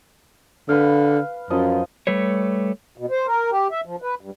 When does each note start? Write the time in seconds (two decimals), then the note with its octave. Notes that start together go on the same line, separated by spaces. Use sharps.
0.69 D3 B4 F5
1.50 F#2 F3 D#5
2.07 G3 A3 B4 C#5
2.98 B2
3.11 C5
3.27 A#4
3.51 G4
3.71 E5
3.85 F3
4.02 B4
4.21 G2